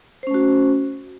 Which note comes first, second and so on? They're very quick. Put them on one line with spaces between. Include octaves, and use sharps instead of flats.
C5 C#4 A3 F#4